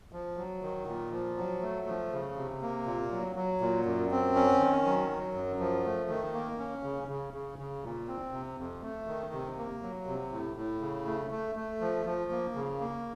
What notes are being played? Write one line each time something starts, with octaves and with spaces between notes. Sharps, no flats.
F3
F#3
D#3
A#2
F3
F#3
A3
F3
C#3
C3
A#3
A#2
F#3
F#3
A#2
F#2
C4
C#4
D#3
F#3
F#3
F#2
F3
A3
D#3
A#3
C#4
C#3
C#3
C#3
C#3
A#2
C4
C3
F2
A3
D#3
C3
A#3
F#3
C3
A2
A2
C#3
A3
A3
A3
F3
F3
A#3
C#3
A#3